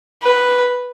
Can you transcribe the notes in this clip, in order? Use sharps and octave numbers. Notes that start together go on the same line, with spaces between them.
B4